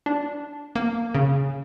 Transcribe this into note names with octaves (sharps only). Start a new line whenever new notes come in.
D4
A#3
C#3